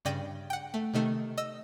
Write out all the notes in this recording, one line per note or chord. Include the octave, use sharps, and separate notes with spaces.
G2 C#3 D5 G5 A#6 D#7
F#5 G5
A3
C3 D#3 A3
D#5 E6